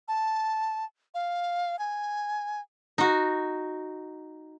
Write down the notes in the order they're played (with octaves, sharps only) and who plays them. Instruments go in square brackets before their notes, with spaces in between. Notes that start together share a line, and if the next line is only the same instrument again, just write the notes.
[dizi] A5
F5
G#5
[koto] D#4 F#4